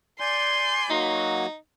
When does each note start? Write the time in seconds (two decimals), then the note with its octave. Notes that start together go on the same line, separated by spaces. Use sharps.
0.20 D5 G#5 C6 G6
0.90 F#3 A#3 D#4 F#4